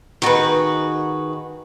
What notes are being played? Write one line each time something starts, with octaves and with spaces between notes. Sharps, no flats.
D#3 F#4 G#4 B4